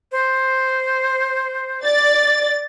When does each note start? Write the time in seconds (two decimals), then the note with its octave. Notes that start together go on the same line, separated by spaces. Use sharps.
0.12 C5
1.84 D5 A6